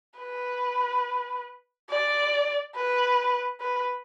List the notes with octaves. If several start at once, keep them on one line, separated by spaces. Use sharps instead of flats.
B4
D5
B4
B4